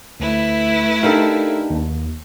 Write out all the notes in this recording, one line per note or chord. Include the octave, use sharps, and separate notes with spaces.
D2 A3 E4 B4
D4 D#4 G4 A4 A#4 F5
D#2